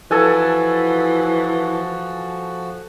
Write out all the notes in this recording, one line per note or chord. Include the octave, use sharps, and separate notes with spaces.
E3 F3 F#4 A4 G#5